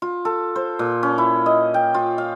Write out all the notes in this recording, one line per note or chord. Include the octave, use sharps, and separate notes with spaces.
F4
A4
C5
A#2
C#4
E4
D#5
G5
F4
F5